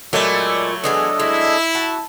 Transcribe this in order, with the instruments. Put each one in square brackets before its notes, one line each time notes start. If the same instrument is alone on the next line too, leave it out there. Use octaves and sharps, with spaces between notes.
[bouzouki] A#2 E4 [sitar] F#3 A3 [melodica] G#3 D5
[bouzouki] E3 B3 G#4 [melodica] D4 A4 D#5
[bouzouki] G#3 [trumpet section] E4
[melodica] F#4 F#5 [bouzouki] A5